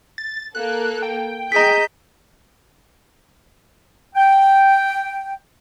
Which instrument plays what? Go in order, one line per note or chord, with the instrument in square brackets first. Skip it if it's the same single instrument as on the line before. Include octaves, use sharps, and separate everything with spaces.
[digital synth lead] A6
[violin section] A#3 A4 [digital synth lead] F#6
[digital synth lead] G5
[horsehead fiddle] G#4 D#5 [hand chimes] A#5 B6 [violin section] G6
[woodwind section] G5